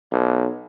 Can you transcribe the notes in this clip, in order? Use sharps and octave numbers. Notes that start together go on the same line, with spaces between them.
B1